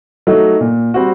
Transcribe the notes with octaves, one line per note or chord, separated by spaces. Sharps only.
F#3 A3 D#4
A#2
G3 C4 F#4